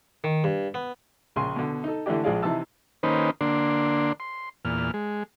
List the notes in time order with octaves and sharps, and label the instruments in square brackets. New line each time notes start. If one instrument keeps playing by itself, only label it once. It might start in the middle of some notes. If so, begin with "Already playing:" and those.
[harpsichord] D#3
G2
B3
[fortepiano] A#1 C#3 G#5 C6
B2 D3
D#4 A4
D3 E3 A3 D4 G4
A#1 F3 G#3 G#4 D5 F5
C3 E3 D#4 A5 E6
[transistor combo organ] D#3 A#3 C#4 D#4 B4 C5
D3 A#3 D4 C6
C6
E2 A#2 F6
G#3